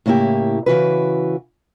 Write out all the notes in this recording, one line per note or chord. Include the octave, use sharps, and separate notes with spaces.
A2 C#3 A#3 E4 G4
C#3 E3 F#4 B4